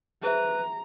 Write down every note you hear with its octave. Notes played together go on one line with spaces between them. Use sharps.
G#4 B4 C5 E5 A#5